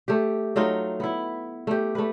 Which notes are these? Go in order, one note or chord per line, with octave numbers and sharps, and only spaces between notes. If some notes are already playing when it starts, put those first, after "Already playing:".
A3 G4
F#3 A3 D#4 F4
B3 E4
A3 G4
A3 B4